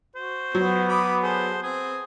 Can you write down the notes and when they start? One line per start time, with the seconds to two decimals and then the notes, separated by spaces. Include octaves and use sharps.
0.16 F#4 C5
0.55 F#3 B3
0.88 B5 D6 D#6
1.23 G#4 A4 C5
1.63 C4 G#4